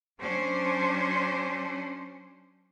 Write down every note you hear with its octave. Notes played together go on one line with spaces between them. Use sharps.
F#3 C#4 D4 C5